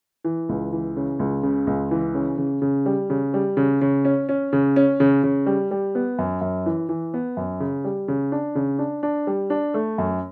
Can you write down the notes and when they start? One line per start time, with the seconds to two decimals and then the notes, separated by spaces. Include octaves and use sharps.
0.24 E3
0.49 C#2
0.73 E3
0.97 C#3
1.19 C#2
1.43 C#3
1.67 C#2
1.91 E3
2.14 C#3
2.38 C#3
2.62 C#3
2.86 G3
3.10 C#3
3.34 G3
3.57 C#3
3.81 C#3
4.05 C#4
4.29 C#4
4.53 C#3
4.76 C#4
5.00 C#3
5.24 C#3
5.46 G3
5.71 G3
5.95 B3
6.19 F#2
6.41 F#2
6.66 E3
6.89 E3
7.14 B3
7.37 F#2
7.60 C#3
7.84 G3
8.08 C#3
8.32 D4
8.55 C#3
8.79 D4
9.03 D4
9.27 G3
9.50 D4
9.74 A3
9.98 F#2